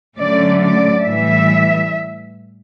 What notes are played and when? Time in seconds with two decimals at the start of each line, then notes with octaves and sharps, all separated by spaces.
0.18 D3 F#3 A3 C#4 D5
0.60 D5
1.03 A2 E3 G3 E5